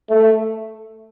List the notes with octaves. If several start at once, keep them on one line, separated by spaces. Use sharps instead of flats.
A3